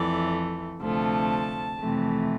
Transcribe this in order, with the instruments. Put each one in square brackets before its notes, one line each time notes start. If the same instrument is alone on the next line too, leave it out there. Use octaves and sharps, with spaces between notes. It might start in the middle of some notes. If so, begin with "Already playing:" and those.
Already playing: [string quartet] F2 E3 A3 D5
D2 C3 F3 A3 A5
F2 C3 E3 A3